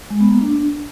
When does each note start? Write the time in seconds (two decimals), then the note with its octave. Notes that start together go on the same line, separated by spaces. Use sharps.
0.10 G#3
0.20 B3
0.31 A#3
0.41 D4